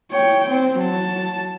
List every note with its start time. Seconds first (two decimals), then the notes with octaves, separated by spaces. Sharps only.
0.12 C#5 G5
0.50 C4
0.79 F#3 A5